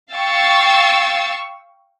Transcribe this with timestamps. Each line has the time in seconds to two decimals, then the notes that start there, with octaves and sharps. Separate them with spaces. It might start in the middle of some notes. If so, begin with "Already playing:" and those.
0.12 F5 G5 C#6 E6 A6